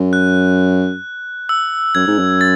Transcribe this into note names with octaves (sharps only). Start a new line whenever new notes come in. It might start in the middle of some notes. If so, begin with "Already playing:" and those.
Already playing: F#2
F#6
E6
F#2 G#6
G#2
F#2
A6